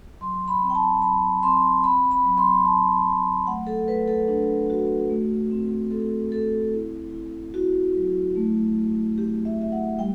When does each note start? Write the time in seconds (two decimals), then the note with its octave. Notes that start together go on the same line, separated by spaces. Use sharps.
0.20 F#3 C6
0.48 B5
0.62 C4
0.70 G5
0.75 A5
1.02 F#3 B5
1.43 C4 C6
1.83 C4 B5
2.11 B5
2.25 F#3
2.38 C6
2.65 C4 A5
3.06 F#3
3.47 A3 F#5
3.67 A4
3.87 A3 B4
4.08 A4
4.28 D4
4.70 F#4
5.10 A3
5.51 C4
5.91 C4 A4
6.32 C4 A4
6.73 E4
7.13 E4
7.54 E4 F#4
7.95 F#3
8.36 A3
8.77 F#4
9.17 C4 G4
9.45 E5
9.58 A3 E5
9.72 F#5
9.99 G3 G5